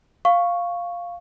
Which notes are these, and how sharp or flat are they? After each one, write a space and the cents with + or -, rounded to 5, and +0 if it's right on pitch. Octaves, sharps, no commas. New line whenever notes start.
F5 +0 C#6 +0